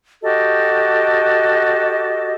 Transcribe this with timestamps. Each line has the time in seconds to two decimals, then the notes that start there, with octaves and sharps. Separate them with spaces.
0.22 F#4 G4 A4 D#5